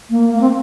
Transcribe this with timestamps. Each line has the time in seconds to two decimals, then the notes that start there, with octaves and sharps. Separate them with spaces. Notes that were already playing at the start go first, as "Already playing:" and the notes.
0.10 A#3
0.34 A#3
0.41 C4